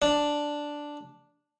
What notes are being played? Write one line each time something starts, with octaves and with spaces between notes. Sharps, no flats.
D4